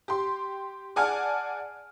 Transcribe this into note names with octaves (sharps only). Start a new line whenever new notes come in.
G4 C6
G#4 D5 F#5 G#5 A5 F6